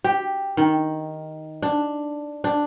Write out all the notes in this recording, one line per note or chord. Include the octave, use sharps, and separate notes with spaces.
G4
D#3
D4
D4